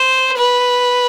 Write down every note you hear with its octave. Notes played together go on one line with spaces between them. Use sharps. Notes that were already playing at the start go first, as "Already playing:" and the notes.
Already playing: C5
B4